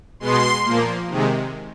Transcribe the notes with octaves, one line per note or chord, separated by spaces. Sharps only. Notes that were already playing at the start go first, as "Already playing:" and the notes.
B2 G#3 B3 C6
A#2 F3 A#3
C3 D#3 G#3